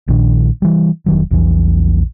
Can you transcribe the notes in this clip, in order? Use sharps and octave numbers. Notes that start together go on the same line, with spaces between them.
A#1 A#2 D#3 D4
E3 G3
F1 D#3 F#3
A#1 E2 E3